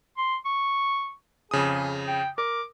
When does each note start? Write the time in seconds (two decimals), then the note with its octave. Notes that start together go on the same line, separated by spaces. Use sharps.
0.18 C6
0.45 C#6
1.51 F2 C#3 G#4 D#6
2.08 G5
2.38 A#4 D6